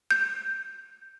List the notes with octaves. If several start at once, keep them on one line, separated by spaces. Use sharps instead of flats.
G6